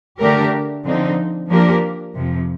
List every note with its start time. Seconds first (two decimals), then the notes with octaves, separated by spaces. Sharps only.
0.20 D3 A3 D4 G4 A#4
0.85 D3 F3 C4 D#4
1.50 F3 A#3 D4 G4 A#4
2.14 F2 C3 F3